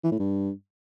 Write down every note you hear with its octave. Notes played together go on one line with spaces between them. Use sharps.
E3
A2
G2